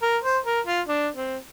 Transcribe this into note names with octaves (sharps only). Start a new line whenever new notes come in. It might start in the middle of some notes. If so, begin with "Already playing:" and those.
A#4
C5
A#4
F4
D4
C4